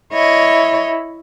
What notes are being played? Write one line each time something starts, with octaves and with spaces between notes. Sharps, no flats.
E4 C#5 D#5